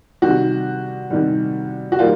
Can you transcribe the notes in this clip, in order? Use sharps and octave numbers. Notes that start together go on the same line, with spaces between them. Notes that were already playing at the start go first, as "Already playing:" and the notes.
C3 D#3 G3 F#4
C3 D#3 G3
F#4
D#3 G3 A#3 F4